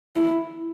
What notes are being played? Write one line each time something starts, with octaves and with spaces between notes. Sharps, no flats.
E4